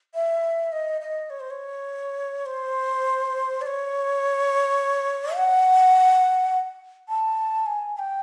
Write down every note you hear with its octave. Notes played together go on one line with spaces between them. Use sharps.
E5
D#5
D#5
C#5
C5
C#5
C5
D5
C#5
F#5
A5
G#5
G#5
G5